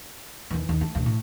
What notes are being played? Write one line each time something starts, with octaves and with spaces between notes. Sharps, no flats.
D#2 E3
D#2
A3
E1 D2
A2